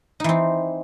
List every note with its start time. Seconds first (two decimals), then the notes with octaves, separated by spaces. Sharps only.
0.20 D#4
0.24 E3
0.29 C4